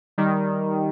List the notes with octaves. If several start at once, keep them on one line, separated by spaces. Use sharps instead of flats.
D#3 G3